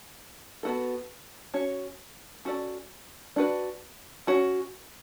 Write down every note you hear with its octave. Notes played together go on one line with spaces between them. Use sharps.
B3 F#4 A4
C#4 F#4 C#5
C#4 F#4 A4 D5
D4 F#4 B4
C#4 F#4 C#5